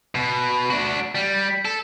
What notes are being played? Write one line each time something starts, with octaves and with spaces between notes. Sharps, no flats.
B2
D4 F#4
G3
A4